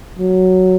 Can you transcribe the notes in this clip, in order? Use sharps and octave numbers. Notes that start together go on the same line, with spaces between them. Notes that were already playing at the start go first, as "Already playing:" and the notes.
F#3